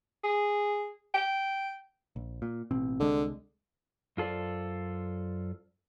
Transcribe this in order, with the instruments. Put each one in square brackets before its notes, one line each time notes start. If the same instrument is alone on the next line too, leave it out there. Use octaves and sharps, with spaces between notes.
[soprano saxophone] G#4
G5
[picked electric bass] A#1
A#2
A1 B2 C4
[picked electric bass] C2 G#3 [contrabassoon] D3
[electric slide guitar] F#2 F4 A4 C5 D5